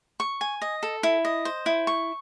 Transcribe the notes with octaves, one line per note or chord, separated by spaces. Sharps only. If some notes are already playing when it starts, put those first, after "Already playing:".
C#6
G#5
D#5
A4
E4
D#5
C5
E4
C#6